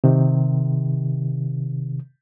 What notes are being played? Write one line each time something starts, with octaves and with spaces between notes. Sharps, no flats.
C3 D#3